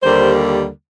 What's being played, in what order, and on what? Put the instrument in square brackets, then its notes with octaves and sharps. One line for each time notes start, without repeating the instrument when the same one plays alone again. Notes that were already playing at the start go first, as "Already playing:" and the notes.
[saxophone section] D#2 D3 G3 A#3 C5